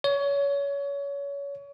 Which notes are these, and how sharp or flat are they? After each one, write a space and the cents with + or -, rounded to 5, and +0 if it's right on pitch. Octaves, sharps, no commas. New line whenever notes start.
C#5 +25